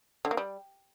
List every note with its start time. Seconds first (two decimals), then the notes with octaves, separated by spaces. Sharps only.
0.25 D3
0.31 A#3
0.37 G3